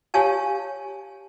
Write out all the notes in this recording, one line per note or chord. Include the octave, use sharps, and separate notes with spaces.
G4 C#5 F5 G#5 A5